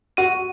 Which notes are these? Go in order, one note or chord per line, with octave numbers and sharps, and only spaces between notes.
F#4 D#7